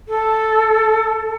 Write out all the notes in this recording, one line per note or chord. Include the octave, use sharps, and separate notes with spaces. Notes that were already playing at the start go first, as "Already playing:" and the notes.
A4